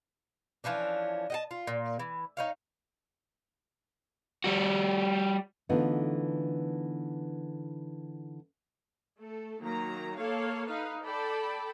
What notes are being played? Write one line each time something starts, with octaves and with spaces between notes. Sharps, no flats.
E3 F3 C#4 D4
D#5 F#5 A5
F4
A#2
E3
D#4 C#5 F5
G3 F#4
D3 E3 A3 B3 D#4 F4
A3 A4
D#3 F#3 A#3 A#5
A#3 A4 C#5 F5
D#4 B4 F5
A4 D5 G5 A5 B5